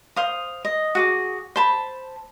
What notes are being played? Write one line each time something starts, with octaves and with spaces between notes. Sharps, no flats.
C5 F5 D#6
D#5
F#4 G#4 D6
C5 A5 B5